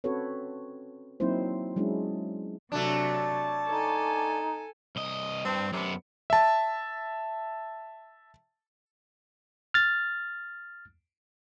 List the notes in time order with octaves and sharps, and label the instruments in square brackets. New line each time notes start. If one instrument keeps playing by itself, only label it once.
[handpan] C4 C#4 F#4 A4 B4 C#5
F#3 A#3 C4 D#4 E4 C5
F#3 G#3 C#4 D4 E4
[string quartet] C3 F#3 [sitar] A3 D4 [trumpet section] C#5 A5 D6
[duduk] D#4 [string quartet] A4 G#5
[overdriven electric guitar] C2 D#5
[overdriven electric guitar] G2 [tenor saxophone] C4
[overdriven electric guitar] F#2 B3 [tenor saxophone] C3
[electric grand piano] E5 A5
[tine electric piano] F6 A6